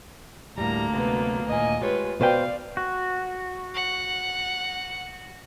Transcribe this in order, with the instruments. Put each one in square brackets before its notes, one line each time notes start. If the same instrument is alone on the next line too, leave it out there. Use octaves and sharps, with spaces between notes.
[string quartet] D2 A#3 [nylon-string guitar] A2 G3 [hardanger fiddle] A#5
[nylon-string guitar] C3 F#3 G#3 [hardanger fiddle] B3
[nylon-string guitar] D#2 A#2 [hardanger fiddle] D#5 G#5
[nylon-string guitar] G#3 G4 C#5 [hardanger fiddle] F4 B4
[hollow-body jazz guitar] B2 B4 G5 [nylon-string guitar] C5 [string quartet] D5 [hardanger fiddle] F5
[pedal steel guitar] F#4
[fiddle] F#5